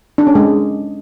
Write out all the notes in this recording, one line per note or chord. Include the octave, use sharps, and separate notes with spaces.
D4
C#4
G#3